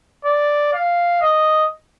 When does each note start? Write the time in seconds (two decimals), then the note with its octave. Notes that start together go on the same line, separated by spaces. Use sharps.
0.25 D5
0.73 F5
1.22 D#5